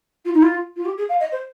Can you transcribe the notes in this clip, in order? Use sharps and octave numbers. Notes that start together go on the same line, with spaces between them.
F4
D#4
F4
F4
G4
G#4
F5
D#5
C5